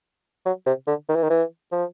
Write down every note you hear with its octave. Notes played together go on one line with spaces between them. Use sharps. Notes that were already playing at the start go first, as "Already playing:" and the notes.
F#3
C3
D3
D#3
E3
D#3
E3
F3